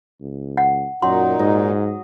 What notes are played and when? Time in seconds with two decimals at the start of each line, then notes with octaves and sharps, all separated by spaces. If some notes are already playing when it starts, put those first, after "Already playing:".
0.21 C#2
0.58 F#5
1.02 F#2 A#2 F#3 D#4 C6
1.39 G#2 D#5